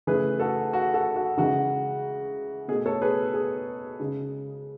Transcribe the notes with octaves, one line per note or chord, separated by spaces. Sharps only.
C#3 E3 A3 G#4 B4
F#4 A4
F#4
F#4 A4
F#4
C#3 E3 G#3 F#4
B2 A3 G#4
A4 C#5
G#4 B4
G#4
C#3 G#3